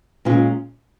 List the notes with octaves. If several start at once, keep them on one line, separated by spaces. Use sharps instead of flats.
A#2 G#3 C#4 F4